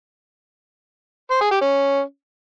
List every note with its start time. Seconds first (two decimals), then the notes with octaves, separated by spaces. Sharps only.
1.31 C5
1.41 G#4
1.51 G4
1.61 C#4